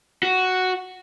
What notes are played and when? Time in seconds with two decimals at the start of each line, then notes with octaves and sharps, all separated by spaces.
0.23 F#4